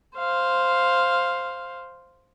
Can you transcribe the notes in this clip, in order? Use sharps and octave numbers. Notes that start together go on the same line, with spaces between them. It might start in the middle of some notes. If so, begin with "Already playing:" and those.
C5 F5